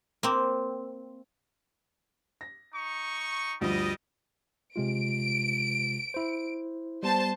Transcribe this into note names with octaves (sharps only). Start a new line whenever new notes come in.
A#3 C4
A#6
D#4 C#6
D2 G2 F3 G3 D#5
C3 G#3 F4 D7
E4 C5
G3 B3 C5 A5